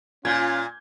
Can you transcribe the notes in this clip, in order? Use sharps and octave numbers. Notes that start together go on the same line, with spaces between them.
A#2 C#4 F4 G#5 G6 G#6